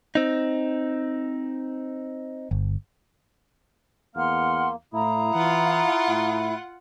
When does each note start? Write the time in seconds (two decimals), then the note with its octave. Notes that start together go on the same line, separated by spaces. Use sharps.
0.15 C4 D#4
2.51 G1
4.15 E2 A#3 F#5 C6 F6
4.93 A2 E4 F5 A#5 D#6
5.35 E3 F4 F#5
6.08 A2